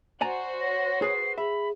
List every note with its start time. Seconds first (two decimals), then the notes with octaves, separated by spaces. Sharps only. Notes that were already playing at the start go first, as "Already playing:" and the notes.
0.21 F#4 C5 D5 G#5 A#5
0.61 C#5 A#6
1.02 G#4 B4 C7
1.38 G#4 E5 B5